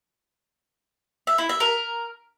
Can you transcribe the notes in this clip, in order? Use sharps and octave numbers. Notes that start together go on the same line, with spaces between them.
E5
E4
E5
A#4